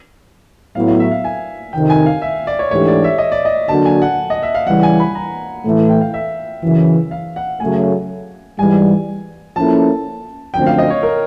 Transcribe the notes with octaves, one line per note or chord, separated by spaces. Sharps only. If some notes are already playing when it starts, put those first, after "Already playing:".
A2 F#3 B3 E4 F5
F5
E5
F5
G#5
F2 C3 D#3 G5
G#5
F5
E5
D5
C#5
G#2 E3 A3 D4 G4 C#5
D5
E5
D#5
D5
D#5
D3 F#3 A#3 D4 F#4 A5
G#5
F#5
D#5
E5
F5
C#3 E3 G3 F#5
G#5
B5
A#5
A2 E3 A3
G5
F5
E5
F#2 C#3 E3
F5
F#5
F#2 C#3 F#3 A3 G#5
G#2 E3 G3 G#5
F3 A#3 C#4 E4 A4 A5
F#2 D3 F3 A3 C4 G5
F5
D#5
C#5
A#4